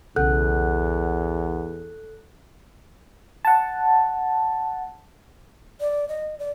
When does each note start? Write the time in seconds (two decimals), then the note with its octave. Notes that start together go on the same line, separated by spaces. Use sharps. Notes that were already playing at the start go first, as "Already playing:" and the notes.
0.16 B1 E2 C#3 A4 F#5 F#6 G6
3.45 F#5 A5
5.80 D5
6.09 D#5
6.39 D5